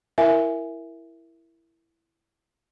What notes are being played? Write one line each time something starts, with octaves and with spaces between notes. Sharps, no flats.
E4 A#4 E5 G#5